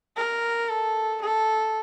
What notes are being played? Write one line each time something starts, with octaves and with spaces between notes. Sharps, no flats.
A#4
A4
A4